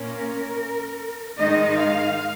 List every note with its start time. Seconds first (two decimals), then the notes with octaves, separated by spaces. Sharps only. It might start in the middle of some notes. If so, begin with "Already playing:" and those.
Already playing: A#2 A#3 C#4 A#4
1.39 G#2 D#3 G#3 D#4 D#5
1.78 F5